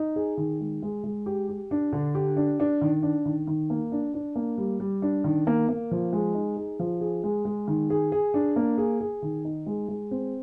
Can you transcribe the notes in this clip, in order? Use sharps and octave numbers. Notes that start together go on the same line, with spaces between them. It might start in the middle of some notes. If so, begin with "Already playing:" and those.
Already playing: D#4
G#4
D#3
G#3
G#3
G#3
G4
G4
D4
D3
G4
D4
D4
D#3
D4
D#3
D#3
A#3
D4
D4
A#3
G3
G3
D4
D#3
A#3
A#3
F3
G#3
D#4
G#4
F3
G#4
G#3
G#3
D#3
G#4
G#4
D4
A#3
G#4
G#4
D#3
D#4
G#3
G#3
C4